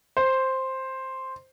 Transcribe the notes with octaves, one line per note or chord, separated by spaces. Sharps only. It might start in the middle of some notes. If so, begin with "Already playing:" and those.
C5